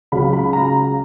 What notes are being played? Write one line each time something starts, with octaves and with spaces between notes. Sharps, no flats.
C#2 C#3 F#3 B5
B5
A#5